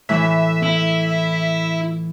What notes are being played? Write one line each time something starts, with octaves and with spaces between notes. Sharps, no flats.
A2 E3 E5
E4